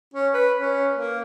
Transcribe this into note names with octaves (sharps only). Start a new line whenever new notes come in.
C#4
B4
C#4
A#3